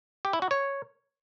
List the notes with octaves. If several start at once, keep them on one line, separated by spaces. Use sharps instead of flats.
G4
E4
F#4
C#5